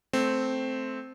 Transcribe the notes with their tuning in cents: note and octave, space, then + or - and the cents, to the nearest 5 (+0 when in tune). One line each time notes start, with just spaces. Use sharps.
A3 -10 C4 -5